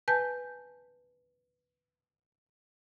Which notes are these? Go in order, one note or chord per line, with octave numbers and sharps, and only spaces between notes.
B4 G#5 A5 G6